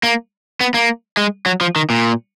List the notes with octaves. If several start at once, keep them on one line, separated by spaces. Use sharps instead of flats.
A#3
B3
A#3
G#3
F#3
F3
D#3
A#2